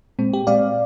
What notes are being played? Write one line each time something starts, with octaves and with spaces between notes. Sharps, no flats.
A#2 G#3 C4
G4
A#2 G#3 C4 D5 F5